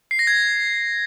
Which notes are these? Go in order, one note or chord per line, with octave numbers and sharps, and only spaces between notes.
C7
A#6
G#6